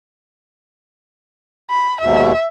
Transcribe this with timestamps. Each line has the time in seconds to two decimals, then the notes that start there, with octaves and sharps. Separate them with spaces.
1.70 B5
2.01 D#2 G#2 B2 E5